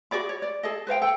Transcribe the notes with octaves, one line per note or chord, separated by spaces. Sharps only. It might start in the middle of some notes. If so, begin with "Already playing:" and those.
F#4 G#4 D5 B5
C#5
D5
G#4 A4 D#5
B4 C5 F5 G5
A4 G5